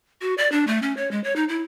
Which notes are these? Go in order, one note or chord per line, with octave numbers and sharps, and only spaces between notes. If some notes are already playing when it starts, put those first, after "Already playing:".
F#4
D5
D4
A3
C#4
C#5
G#3
C#5
D#4
E4